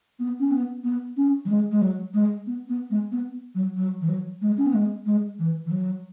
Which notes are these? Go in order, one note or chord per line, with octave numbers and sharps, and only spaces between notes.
B3
C#4
B3
B3
C#4
F#3
G#3
G#3
F#3
G#3
B3
B3
G#3
B3
F#3
F#3
E3
F#3
G#3
C#4
B3
G#3
G#3
E3
E3
F#3